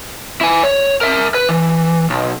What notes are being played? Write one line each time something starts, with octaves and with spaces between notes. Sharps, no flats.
E4 G#5
C#5
A#4 E5
B4
E3
B1